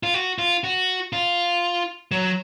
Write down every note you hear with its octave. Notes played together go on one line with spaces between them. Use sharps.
F4
F#4
F4
F#4
F4
F#3